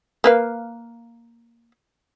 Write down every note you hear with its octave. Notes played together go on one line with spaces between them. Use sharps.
A#3 B4 F5